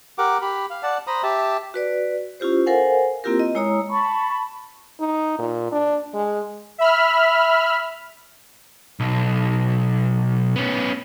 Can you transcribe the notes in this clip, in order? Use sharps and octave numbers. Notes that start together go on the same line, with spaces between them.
G4 A#4 F#5 D6
G4 B5
F5
D5 F#5 A5
C5 A#5 B5 D#6
G4 E5 A5
F#4 B4 D5
C#4 E4 F4 G4 C5
A4 A#4 C5 F5 F#5 G#5
A#3 C4 E4 F4 G4 A#4
D#5
G#3 E4 C#5 A#5 D#6 E6
A5 B5 C#6
D#4
A#2
D4
G#3
E5 B5 F6
B1
B3 C#4